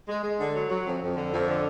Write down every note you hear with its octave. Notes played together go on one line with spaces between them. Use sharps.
G#3
G#3
D3
F#3
F#3
F2
F2
D3
F2
D3